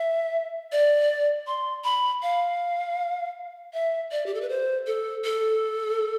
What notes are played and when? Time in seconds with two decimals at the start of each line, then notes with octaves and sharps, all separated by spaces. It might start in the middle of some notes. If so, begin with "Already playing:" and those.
Already playing: E5
0.72 D5
1.47 C6
1.84 B5
2.22 F5
3.73 E5
4.11 D5
4.26 G4
4.34 A4
4.41 B4
4.49 C5
4.87 A4
5.24 A4